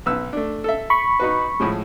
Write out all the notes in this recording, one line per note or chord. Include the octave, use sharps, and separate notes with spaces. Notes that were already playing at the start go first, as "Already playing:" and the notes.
B1 B4 E6
A3 D4
A4 E5
B5 C#6
D#4 F#4 B4
A2 F3 G#3